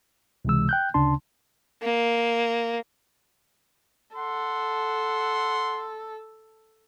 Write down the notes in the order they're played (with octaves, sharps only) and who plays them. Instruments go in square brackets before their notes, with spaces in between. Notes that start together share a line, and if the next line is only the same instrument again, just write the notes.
[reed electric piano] C#2 C3 E3 G#3 E6
G5 F#6 G6
D2 C#3 D4 A5 C6
[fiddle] A#3
[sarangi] A4 [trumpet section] F#5 C6